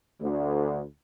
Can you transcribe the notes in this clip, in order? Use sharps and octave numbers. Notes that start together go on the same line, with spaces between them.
D2